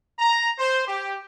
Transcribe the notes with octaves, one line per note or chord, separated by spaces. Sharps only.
A#5
C5
G4